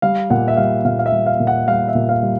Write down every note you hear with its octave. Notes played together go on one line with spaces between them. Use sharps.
G3 F5
A#2 F#5
E5
G3 F5
A#2 F5
F5
E5
G3
F5
A#2
F#5
G3 F5
E5
A#2
F5
G3